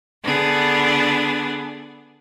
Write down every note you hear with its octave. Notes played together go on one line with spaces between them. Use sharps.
D3 B3 D4 G#4